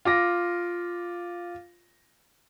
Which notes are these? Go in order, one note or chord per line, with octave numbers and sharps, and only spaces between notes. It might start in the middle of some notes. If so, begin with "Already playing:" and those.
F4 D6 A#6